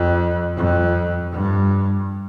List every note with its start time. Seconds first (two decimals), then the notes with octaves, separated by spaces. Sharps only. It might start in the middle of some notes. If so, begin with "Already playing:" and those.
Already playing: F2
0.57 F2
1.32 G2